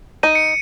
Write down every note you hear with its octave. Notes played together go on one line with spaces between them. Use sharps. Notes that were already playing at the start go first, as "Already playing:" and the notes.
D#4 D#7
C#7